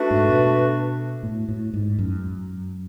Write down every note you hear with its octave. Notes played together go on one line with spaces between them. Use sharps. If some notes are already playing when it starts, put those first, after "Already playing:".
Already playing: A3 D4 F#4 B4
G#2
B2
A2
A2
G#2
F#2